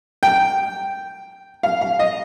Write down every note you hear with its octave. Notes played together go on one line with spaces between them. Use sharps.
G5
F5
F5
D#5